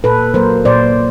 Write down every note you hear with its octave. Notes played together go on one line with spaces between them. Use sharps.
A#2 A4 B4
F#3 A#3 A#4 C5
A#2 C5 D5